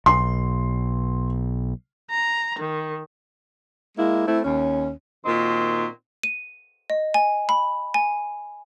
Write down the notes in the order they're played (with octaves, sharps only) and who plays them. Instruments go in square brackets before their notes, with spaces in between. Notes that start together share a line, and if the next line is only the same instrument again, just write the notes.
[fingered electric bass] B1 [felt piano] C6
[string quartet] A#5
D#3
[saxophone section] G#3 A#3 E4
A3 C4 E4
D#2 C#4
[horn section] A#2 D#3 C4 D#4 F#4
[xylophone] D#7
D#5
G#5
B5
G#5